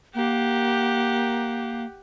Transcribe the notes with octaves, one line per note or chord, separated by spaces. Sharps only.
A#3 G4 F#5